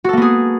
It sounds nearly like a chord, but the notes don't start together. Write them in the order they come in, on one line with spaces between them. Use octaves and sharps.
F#4 A4 A#3 B3 G#4